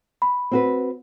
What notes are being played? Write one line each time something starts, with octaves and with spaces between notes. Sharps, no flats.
B5
C4 F#4 B4